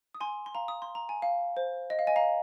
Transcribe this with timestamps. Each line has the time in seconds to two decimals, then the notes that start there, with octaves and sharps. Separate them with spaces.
0.14 D#6
0.21 G#5 C6
0.46 C6
0.55 F5 A#5
0.68 D#6
0.82 C6
0.95 A#5
1.09 G#5
1.22 F5
1.57 C5
1.90 D#5
1.99 F5
2.07 D#5 G#5
2.16 F5 A#5